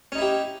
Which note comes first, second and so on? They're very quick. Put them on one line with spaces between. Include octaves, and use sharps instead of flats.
C#4 D#4 E4 G4